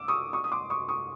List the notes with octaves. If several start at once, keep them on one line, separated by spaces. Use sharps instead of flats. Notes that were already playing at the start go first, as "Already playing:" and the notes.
Already playing: D6 E6
C#6 D#6
C#6 D#6
D#6
C6 D6
C#6 D#6
C#6 D#6